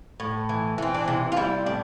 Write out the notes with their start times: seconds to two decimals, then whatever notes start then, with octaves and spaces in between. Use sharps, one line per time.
0.20 A2
0.49 E3
0.78 E3 C4
0.94 D4
1.08 C3 E4
1.32 F4
1.37 G3 E4
1.66 A2 D5